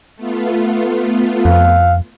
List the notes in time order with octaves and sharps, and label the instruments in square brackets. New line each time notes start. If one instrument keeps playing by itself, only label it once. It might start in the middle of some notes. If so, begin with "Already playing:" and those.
[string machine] A3 B3 F4
[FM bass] F2 [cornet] F5